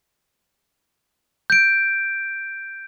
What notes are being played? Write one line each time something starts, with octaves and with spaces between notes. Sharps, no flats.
G6 D7